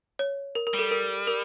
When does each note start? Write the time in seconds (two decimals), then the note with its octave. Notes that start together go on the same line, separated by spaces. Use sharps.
0.19 C#5
0.55 A#4
0.67 A#4
0.74 G3
0.79 A4
0.91 A#4
1.27 A#4